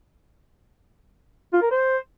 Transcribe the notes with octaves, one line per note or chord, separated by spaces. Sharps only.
F4
A#4
C5